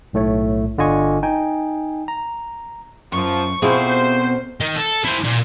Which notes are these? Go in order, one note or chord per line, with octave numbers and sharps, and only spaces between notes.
B1 A2 A3 C#5
G1 D3 F4 D#5 G#5 C#6
D#4 G5 G#5
A#5
F#2 F3 C#6
D2 B2 C4 E4 F4 G#4 C5
D#3 D#4
A4
E4 C5
A#2